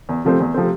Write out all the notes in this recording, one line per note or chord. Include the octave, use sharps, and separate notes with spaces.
E2
C3 F3 A3 C4
E2
C3 F3 A3 C4